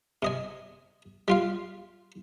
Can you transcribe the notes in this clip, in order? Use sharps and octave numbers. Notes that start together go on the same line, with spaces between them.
C3 D#5 G#5
G3 F4 F5